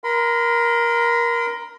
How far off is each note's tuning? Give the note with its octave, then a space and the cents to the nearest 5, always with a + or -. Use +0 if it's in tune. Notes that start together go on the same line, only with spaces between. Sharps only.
A#4 +15 C6 -45